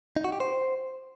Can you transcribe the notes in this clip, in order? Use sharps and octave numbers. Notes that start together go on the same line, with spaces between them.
D#4
F#4
G4
C5